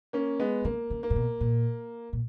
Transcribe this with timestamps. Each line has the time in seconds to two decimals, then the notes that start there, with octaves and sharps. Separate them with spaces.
0.13 A#3 C#4
0.39 G#3 B3
0.65 C#3 A#3
0.90 C#3
1.03 A#3
1.10 A#2
1.16 B2
1.41 A#2
2.13 A#2